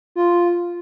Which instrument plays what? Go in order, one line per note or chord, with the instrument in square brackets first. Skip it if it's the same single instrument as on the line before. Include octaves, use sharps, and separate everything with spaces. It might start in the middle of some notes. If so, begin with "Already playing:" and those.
[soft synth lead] F4